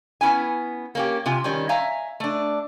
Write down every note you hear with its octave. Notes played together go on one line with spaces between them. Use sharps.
B3 C#4 E4 G#5
A#3 C#4 G4
C3 F4 G#5
D#3 G3 C#4
E5 F5 G#5 A#5
A3 D4